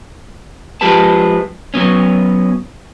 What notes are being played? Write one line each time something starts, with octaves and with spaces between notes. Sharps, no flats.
F3 G#3 G4 G#4 B4 A5
F#3 B3 C#4